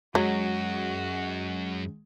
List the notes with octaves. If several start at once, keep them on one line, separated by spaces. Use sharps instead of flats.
F#2 F#3 G#3 F#4